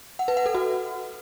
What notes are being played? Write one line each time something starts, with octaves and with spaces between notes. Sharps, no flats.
F#5
B4
F#5
A4
F#4